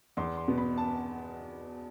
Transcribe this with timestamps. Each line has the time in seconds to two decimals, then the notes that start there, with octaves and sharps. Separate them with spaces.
0.17 E2 C6
0.37 C6
0.48 B2 B3
0.58 B5
0.77 A5